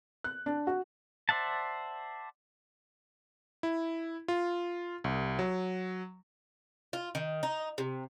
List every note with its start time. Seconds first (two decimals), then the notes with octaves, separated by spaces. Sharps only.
0.24 F#6
0.46 D4
0.67 F#4
1.29 C5 D5 E5 F#5 A5
3.63 E4
4.28 F4
5.04 C2
5.39 F#3
6.93 F4
7.15 D#3
7.43 D#4
7.78 C3